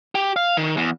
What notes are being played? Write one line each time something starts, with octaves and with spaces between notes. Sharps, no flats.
G4
F5
D#3
E2